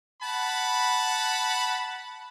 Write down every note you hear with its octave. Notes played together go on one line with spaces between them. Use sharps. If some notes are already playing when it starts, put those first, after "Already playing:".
F#5 A5 B5